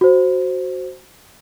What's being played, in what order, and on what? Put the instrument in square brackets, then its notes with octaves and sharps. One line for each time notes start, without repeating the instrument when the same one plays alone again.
[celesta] F#4 C5